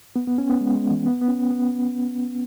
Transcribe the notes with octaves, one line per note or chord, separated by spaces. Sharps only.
B3
B3
C#4
B3
G#3
G#3
E3
B3
B3
C#4
B3